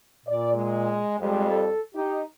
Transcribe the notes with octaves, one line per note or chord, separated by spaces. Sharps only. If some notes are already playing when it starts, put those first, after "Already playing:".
A#2 D5
G#3
F2 G3 G#3
A4
D#4 G4